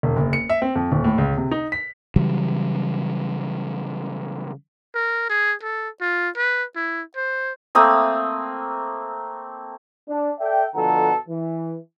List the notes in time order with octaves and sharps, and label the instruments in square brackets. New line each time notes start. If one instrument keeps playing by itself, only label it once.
[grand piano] E1
F#1
C#7
E5
C4
F2
D#1
A2
C#2
C3
D#4
B6
[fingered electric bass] C#3 E3 F#3 G3
[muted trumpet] A#4
G#4
A4
F4
B4
E4
C5
[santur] A3 A#3 C4 D#6
[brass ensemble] D4
A4 D5 E5 G5
B2 D3 F3 A4 F#5 A#5
E3